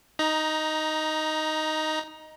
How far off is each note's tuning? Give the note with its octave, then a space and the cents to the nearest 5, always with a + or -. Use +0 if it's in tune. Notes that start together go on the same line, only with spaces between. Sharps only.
D#4 +0 A#5 +20